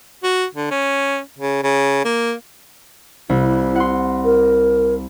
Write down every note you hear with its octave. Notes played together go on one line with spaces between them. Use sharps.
F#4
D3
C#4
C#3
C#3
A#3
C2 E4
F#5 C6
A#4